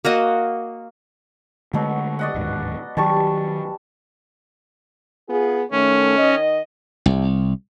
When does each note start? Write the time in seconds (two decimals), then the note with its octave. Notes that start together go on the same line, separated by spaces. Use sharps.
0.05 A#3 F#4 D#5
1.74 B2 D3 F#3 G#3 A3
2.19 D5 D#5 F#5
2.34 D1 D#2 G#2
2.97 D#3 E3 F#3 G3 A5 C#6
5.28 B3 F4 G#4
5.71 D#3 A3 C#4
6.18 D#3 D#5
7.06 C2